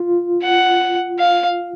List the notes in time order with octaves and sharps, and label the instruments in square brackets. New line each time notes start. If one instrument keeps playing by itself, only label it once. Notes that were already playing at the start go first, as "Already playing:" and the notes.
Already playing: [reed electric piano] F4
[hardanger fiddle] F#5
F5